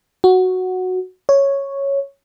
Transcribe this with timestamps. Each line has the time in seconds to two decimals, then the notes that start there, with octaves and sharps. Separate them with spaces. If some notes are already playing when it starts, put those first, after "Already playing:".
0.24 F#4
1.29 C#5